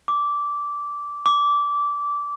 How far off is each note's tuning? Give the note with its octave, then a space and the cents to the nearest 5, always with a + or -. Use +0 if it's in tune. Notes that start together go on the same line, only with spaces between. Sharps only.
D6 -15
D6 -20